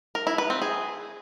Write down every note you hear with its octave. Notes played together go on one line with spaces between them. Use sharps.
A#4
E4
B4
C4
G#4